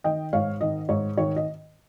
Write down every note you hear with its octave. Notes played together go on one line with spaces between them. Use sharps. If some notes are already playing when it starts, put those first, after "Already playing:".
D#3 D#5 G5
G#2 C#5 F5
D#3 D#5
G#2 C#5
D#3 C#5
D#5